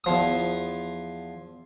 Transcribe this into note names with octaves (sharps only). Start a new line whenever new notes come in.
E2 F3 D#6